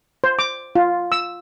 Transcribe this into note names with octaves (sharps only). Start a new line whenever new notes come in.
C5
D6
F4
E6